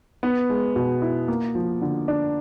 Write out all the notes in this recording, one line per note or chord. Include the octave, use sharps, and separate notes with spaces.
B3
G#3
B2
E4
A#3
F3
D3
D4